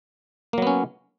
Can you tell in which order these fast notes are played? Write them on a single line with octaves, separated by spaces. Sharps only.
A#3 F#3 B3 C#4